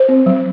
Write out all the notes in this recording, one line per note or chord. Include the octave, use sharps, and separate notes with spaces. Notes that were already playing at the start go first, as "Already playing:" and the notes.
Already playing: C5
C4
F#3